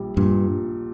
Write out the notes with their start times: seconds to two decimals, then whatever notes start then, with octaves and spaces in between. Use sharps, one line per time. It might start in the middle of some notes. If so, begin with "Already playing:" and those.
Already playing: A#1 G3
0.17 G2 A#2